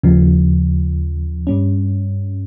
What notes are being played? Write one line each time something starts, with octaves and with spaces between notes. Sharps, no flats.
D#2 C#3 F3
G2 G3 C#4